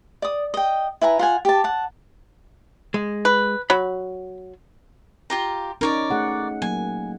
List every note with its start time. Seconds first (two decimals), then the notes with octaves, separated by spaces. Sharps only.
0.22 D5 D#6
0.54 D#5 G5
1.01 E4 B4 G#5 A#5
1.19 F4 F#5 G#5
1.45 G4 A5
1.64 F#5 A5
2.94 G#3
3.25 B4
3.70 F#3 B5
5.30 F4 G4 A#5
5.81 C#4 D#4 A#4 C#5 D5
6.10 A3 G#4 F#5
6.62 F#3 A#3 G#5